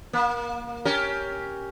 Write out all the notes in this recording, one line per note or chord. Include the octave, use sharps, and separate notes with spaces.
A#3
C#4 G4 A#4